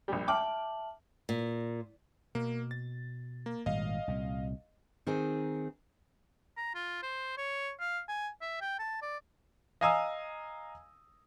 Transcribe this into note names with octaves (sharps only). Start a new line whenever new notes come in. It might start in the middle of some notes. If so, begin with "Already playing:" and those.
A#1 G3
E5 G5 A5 D6 F6 F#7
A#2
B2 A#3
A6
A#3
G#1 A#2 G3 D#5 F5
C2 A#2
D#3 C4 D#4 G#4
A#5
F4
C5
C#5
F5
G#5
E5
G5
A5
D5
D#5 F5 G#5 A#5 D#6 E6